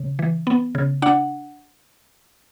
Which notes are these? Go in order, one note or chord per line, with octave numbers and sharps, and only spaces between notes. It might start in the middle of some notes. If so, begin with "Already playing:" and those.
Already playing: C#3
E3
B3
C#3
D4 F#5